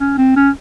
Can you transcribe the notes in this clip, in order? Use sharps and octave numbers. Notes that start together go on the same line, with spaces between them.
C#4
C4
C#4